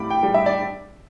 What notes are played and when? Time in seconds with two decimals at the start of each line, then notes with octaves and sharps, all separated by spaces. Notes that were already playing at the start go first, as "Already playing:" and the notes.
Already playing: A2 G3 B5 D6
0.10 G5
0.23 G3
0.34 E5
0.46 D5